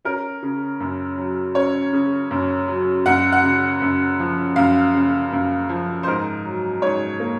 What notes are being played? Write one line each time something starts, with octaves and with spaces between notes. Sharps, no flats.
C#4 A#4
C#3
F#2
F#3
C#4 C#5
C#3
F#2
F#3
F#2 F#5
F#5
C#3
F#2
F3
F#2 F5
C#3
F#2
F3
C5
G#2 A#4
F#3
G#2 C#5
A#3